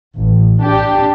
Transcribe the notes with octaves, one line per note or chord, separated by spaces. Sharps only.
A1
D4 G4